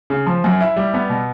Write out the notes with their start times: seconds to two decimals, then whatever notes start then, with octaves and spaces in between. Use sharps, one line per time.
0.10 C#3
0.26 F3
0.44 F#2
0.61 E4
0.76 G3
0.94 B3
1.09 B2